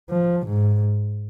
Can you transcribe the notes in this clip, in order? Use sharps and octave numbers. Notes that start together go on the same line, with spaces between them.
F3
G#2